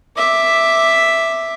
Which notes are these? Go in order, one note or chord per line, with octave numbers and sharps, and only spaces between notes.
E5 D6